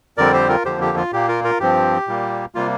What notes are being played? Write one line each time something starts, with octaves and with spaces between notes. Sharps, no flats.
F2 D3 G3 C4 A#4 D5
G4 C5
F4 A#4
F2 D3 F3 A#3 G4 C5
G4
F4
A#2 A#3 G4
F4 A#4
F4 A#4
G2 F3 C4 G4
A#2 G3 A#3
C3 G3 A#3 F4